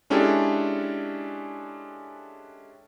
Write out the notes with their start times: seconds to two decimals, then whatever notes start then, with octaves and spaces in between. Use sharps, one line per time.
0.10 G#3 C#4 D4 E4 G4 A4